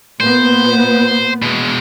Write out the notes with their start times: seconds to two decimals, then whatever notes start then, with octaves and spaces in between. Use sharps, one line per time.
0.21 A#2 B3 C5
1.42 B2 G#3